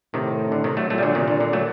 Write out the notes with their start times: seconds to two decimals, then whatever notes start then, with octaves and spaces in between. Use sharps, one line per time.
0.14 A2 C3 D#3
0.52 D3
0.64 C3 D#3
0.77 F#3 A3
0.90 A#2 F#3 A3
0.98 G3
1.02 D3 F#3
1.15 C3 D#3
1.28 D3
1.40 D3
1.53 F#3 A3